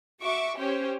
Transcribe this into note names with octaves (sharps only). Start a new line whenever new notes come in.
F#4 E5 C#6 D6
C#4 G4 C5 C#5